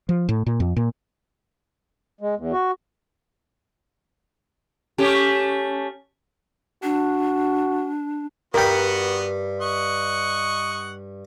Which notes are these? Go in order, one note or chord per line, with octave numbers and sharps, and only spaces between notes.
F3
A2
A#2
F2
A#2
G#3
E2
F#4
A3 C#4 G4
D4 F#4
G2 B3 F#4 A#4 G5 B5
D#5 F#5 C#6